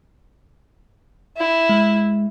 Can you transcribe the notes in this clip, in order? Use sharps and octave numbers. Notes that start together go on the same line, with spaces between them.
E4
G#3